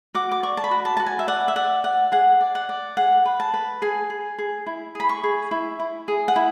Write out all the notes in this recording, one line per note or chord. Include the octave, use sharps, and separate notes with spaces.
F#4 D6
D6
D5 C#6
A5
B5
F#4
A5
F#4 A5
G#5
E5
D5 F#5
E5
D5 F#5
D5 F#5
G#4 F#5
D5
F#5
D5
G#4 F#5
B4
A5
B4
G#4 G#5
G#4
G#4
E4
G#4 B5
C#6
G#4
E4
E4
G#4
F#5
E4